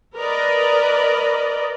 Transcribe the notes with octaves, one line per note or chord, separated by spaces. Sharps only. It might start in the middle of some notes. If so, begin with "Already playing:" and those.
A#4 B4 D5 D#5